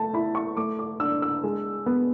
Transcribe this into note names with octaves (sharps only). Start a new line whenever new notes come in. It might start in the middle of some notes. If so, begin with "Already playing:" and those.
Already playing: A3 A5
E4 B5
C#6
A3 D6
D6
D4 E6
E6
G#3
B3